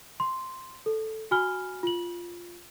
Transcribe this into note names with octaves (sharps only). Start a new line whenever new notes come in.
C6
A4
F#4 G#5 B5 F6 G7
F4 F#7